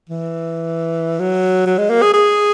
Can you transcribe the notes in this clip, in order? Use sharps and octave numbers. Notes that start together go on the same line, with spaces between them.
E3
F#3
F#3
G#3
A#3
G#4
G#4